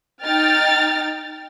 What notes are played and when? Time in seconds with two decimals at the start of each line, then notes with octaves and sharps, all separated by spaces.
0.24 D#4 G5 F6 A6